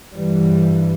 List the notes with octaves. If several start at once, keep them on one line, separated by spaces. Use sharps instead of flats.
G2 E3 G3